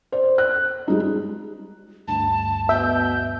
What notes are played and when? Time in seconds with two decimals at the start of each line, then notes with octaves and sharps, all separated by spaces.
0.12 C5 D5
0.38 F#6
0.88 G3 G#3 D#4
2.08 D2 G2 A5
2.69 B2 E5 G6